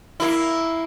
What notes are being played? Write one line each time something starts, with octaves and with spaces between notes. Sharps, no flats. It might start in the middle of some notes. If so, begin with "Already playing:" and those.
A#3 E4